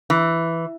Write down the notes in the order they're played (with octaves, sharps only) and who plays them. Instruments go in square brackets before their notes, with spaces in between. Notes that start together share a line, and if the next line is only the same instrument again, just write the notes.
[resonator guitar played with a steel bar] E3